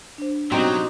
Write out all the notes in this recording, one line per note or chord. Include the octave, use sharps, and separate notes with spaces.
D4 C5
B2 F#3 C4 D#4 F#4 G4 C5